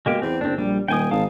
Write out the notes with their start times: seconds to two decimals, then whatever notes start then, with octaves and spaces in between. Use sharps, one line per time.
0.06 B2 G#3 A#3 G4
0.22 E2 C4
0.41 F#1 C4 D4
0.58 A#1 G3
0.88 D#1 G5 G#5 D#6
1.11 G#1 F5 A5 D#6